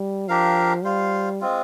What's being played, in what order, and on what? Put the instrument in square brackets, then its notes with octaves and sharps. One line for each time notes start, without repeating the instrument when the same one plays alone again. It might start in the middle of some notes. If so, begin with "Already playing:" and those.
Already playing: [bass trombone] G3
[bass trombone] F3 [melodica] D4 G4 A#4 F5
[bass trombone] G3 [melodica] F4 C5 F5
[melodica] G#3 C4 F4